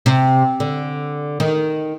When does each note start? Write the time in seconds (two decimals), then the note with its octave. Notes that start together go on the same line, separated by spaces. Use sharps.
0.06 C3
0.60 D3
1.40 D#3